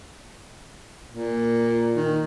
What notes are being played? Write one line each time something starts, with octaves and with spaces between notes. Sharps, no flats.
A#2
D#3